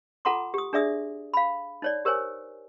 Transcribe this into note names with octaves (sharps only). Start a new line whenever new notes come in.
F4 A4 F#5 A#5 C6 D6
G4 D#6
D4 G#4 D5 E5 D#6
F5 B5
D#4 C#5 D5
G4 A#4 C5 C#5 G#5